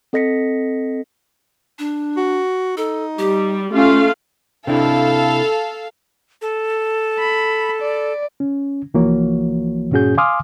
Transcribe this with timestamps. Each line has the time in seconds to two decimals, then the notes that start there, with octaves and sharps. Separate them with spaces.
0.13 C4 A4 D#5 A#6 B6 C#7
1.79 D4
2.17 F#4
2.77 D#4 A4
3.18 G3 G4
3.73 A3 C#4 F4 F5
4.67 C3 D4 E4 A4 F5
6.41 A4
7.19 B5
7.82 D5
8.40 C#4
8.94 C2 E3 F3 A#3 F#4 C#5
9.91 G2 A#2 C#4 F#4 G#4 G6
10.18 F5 G#5 C6 D6 D#6 F6